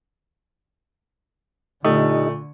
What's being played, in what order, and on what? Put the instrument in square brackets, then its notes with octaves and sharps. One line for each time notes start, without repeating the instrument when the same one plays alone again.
[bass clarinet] A#2 [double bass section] D3 [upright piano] A3 [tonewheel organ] D#4 G4 D#5